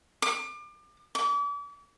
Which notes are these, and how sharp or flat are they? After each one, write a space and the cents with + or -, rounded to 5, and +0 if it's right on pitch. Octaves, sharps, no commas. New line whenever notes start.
D6 +30
D6 -40